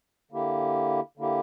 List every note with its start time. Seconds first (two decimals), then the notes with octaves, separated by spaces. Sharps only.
0.31 D3 A#3 E4 G4
1.17 D3 A#3 E4 G4